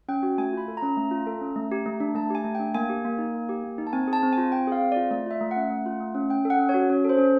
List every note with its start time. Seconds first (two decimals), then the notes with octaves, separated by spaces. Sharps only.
0.08 C#4 G5
0.23 F#4
0.38 A3 G#5
0.53 F4 B5
0.68 A4
0.77 A#5
0.82 C#4
0.97 A3
1.11 F4
1.27 A4
1.41 C#4
1.56 A3
1.72 G4
1.86 A3
2.00 D4
2.15 A3 A5
2.30 G4 G#5
2.44 A3
2.55 D4 G5
2.74 A#3 G#5
2.89 G4
3.05 A#3
3.18 D#4
3.34 A#3
3.49 G4
3.64 A#3
3.78 D#4
3.87 A5
3.93 C4 G#5
4.08 G#4
4.13 A5
4.23 C4
4.33 G#5
4.38 F4
4.52 C4 G5
4.67 G#4 F5
4.81 C4
4.92 F4 D5
5.11 A3 D5
5.26 F4 E5
5.41 A3
5.51 F#5
5.56 C#4
5.70 A3
5.86 F4
6.00 A3
6.15 C#4
6.30 C#4 G5
6.45 A4
6.50 F#5
6.59 C#4
6.69 C#5
6.74 F#4
6.90 C#4 C#5
7.04 A4 C5
7.18 C#4